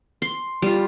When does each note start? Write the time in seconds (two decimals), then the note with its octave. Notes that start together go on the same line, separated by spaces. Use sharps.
0.22 C6
0.62 G3 F4